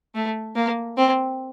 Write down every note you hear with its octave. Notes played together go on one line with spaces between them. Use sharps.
A3
A#3
C4